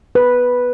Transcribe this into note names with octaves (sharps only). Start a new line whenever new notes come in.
B4